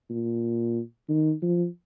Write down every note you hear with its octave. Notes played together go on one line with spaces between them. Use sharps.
A#2
D#3
F3